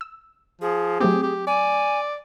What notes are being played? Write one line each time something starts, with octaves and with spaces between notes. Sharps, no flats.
E6
F3 G#4
F#3 A3 C4 G4
G4
D5 G#5